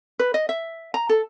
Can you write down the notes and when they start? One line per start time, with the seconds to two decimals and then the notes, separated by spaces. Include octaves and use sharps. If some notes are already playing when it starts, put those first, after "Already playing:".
0.19 B4
0.34 D#5
0.49 E5
0.94 A#5
1.09 A4